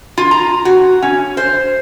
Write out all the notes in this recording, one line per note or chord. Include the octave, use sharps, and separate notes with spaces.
F4
A#5
F#4
C#4
C5